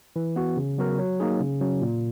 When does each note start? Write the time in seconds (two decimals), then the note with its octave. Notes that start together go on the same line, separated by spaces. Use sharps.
0.16 E3
0.36 B3 F#4
0.57 C#3
0.78 F#3 B3 F#4 A#4
0.99 F#3
1.20 A#3 D#4 G#4
1.40 C#3
1.61 F#3 C#4
1.82 A#2